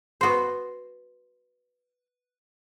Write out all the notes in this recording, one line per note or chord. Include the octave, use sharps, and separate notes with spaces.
B3 F#4 C5